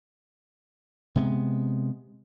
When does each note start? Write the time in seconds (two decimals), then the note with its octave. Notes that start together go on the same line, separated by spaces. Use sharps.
1.16 C3 G#3 B3